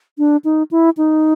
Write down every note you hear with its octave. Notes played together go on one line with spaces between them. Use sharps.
D4
D#4
E4
D#4